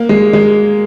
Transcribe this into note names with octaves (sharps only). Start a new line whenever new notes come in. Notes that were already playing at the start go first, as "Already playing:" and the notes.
Already playing: A#3
G#3
G#3